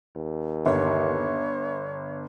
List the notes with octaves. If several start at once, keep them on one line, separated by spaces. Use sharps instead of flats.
D#2
G1 C#5